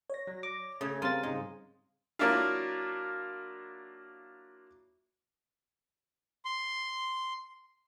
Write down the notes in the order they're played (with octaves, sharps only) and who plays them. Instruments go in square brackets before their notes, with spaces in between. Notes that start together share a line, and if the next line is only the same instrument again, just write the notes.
[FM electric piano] C#5 A#6 [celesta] D5
[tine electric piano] F#3
D6
[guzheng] C#3 [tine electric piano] A3 [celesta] D#6 G#6
[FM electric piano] G3 C4 [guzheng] F4 [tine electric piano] A#4 A6 [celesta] F5 C6 D#7
[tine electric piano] G#2 C#3 G#3 [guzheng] D#4
[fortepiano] F#3 A#3 D4 E4 F4
[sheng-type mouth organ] C6